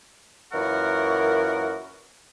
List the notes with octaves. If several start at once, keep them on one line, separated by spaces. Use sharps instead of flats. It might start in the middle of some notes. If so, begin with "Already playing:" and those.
F#2 A#2 E3 A#4 F#5 C#6